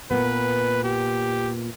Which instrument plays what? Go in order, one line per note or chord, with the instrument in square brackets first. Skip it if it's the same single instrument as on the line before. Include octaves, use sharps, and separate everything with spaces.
[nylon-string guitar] A#2 B3 [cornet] B4
[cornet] G4